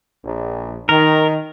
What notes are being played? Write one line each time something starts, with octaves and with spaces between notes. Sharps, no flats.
A#1
D#3 A#4